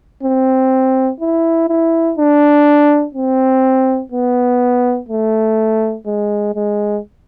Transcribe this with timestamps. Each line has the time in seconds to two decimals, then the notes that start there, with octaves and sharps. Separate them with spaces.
0.23 C4
1.20 E4
1.68 E4
2.18 D4
3.14 C4
4.12 B3
5.09 A3
6.06 G#3
6.55 G#3